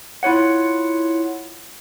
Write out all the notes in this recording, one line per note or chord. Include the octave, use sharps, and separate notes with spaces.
E4 F4 C#5 F#5